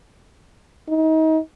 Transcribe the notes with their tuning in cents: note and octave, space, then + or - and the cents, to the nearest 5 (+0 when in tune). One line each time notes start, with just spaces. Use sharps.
D#4 +30